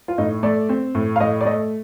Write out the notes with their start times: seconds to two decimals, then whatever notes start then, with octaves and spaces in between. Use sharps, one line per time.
0.08 F4
0.18 A2 D#4
0.43 A3 D5
0.69 C4
0.95 A2
1.16 F5
1.20 A2 D#5
1.41 D5
1.45 A3 D#5